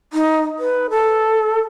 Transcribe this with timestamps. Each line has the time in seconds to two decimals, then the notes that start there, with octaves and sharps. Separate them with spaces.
0.13 D#4
0.59 B4
0.90 A4